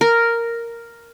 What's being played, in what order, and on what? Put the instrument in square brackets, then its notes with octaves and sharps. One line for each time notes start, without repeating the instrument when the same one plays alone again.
[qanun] A#4